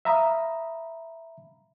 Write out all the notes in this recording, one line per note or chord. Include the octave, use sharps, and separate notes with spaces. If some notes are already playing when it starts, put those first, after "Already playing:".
E5 F5 A#5 B5 D#6